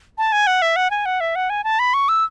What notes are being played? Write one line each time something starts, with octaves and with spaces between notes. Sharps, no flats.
A5
G#5
F#5
E5
F#5
G#5
F#5
E5
F#5
G#5
A5
B5
C#6
E6